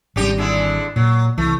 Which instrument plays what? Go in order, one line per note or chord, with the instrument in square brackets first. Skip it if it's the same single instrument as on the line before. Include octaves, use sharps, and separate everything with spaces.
[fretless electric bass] G#1 G3 [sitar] C#3 D#4 G4
[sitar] D3 G#3 E4
[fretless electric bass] A#2 [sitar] F#3
[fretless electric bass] C2 E3 [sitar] A3